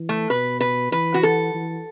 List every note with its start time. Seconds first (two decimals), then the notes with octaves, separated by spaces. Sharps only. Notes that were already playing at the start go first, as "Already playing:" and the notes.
Already playing: E3
0.09 A3
0.30 B2 B4
0.61 B4
0.92 E3 B4
1.14 F#4
1.23 A4
1.54 E3